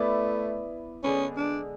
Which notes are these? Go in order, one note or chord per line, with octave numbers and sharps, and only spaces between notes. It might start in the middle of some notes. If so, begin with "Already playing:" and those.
Already playing: A3 B3 E4 B4 D5
D3 G#3 B3 C#4
D4